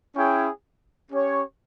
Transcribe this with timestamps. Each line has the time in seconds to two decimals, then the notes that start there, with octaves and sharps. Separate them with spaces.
0.16 C#4 E4 G#4 C#5 G5
1.10 C#4 G4 C#5